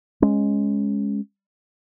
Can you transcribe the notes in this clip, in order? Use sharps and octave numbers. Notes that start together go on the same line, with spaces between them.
G#3 C#4